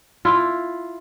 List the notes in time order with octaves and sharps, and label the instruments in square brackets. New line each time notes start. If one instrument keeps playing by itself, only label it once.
[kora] E4 F4